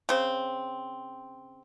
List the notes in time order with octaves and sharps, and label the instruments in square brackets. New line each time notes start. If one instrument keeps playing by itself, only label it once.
[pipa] C#3 C4